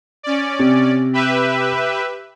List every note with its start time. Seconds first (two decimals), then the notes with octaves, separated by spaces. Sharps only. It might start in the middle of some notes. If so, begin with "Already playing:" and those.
0.23 C#4 D5
0.59 C3
1.13 G4 B4 E5